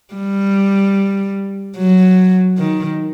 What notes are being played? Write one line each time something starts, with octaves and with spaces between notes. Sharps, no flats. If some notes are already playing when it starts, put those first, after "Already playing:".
G3
F#3
D#3